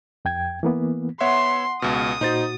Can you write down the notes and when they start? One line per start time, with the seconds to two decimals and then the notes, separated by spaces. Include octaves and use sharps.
0.25 F2 G5 G#6
0.63 E3 A#3 B3
1.20 B3 C#5 E5 F#5 C6
1.82 C#2 B2 D#6
2.21 A#2 D#4 F#4 C5 A6